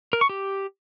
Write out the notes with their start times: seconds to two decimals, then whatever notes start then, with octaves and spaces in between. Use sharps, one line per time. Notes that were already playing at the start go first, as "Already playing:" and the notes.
0.13 A#4
0.21 C#6
0.29 G4